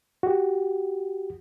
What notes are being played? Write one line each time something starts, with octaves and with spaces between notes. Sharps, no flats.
F#4 G4